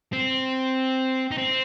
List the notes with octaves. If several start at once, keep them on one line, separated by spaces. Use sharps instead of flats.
C4
D#4
C4